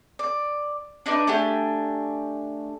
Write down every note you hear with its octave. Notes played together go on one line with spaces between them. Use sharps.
D5
D4 D#4 B4 D5
A3 D4 G4 G#5